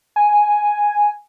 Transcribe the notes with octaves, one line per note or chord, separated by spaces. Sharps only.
G#5